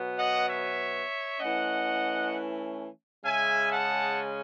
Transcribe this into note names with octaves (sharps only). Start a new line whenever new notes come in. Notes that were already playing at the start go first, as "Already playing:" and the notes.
Already playing: B2 F#3 B3
D#5 F#5
C#5 E5
E3 A3 C#4 D#5 F#5
C#3 G#3 C#4 E5 G#5
F#5 A5